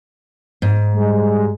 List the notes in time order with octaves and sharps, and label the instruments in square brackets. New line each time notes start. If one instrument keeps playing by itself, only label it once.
[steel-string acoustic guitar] G#2
[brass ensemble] G3 G#3